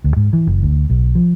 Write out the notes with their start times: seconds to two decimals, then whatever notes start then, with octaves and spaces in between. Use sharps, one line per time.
0.04 D2
0.17 G#2
0.33 E3
0.47 F#1
0.63 D2
0.90 B1
1.15 F3